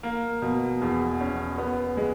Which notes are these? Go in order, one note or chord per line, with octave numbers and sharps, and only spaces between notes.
A#3
B2
E2
C#4
B3
G#3